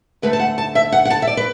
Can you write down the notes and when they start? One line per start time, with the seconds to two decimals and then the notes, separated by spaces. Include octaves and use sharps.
0.22 D2 D3 A3 B4
0.33 A5
0.40 F#5
0.58 A5
0.75 E5
0.92 F#5
1.05 F#5
1.10 A5
1.22 E5
1.27 D5
1.37 B4